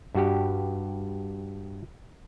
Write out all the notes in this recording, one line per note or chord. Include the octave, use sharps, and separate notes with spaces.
G2 F#4 G4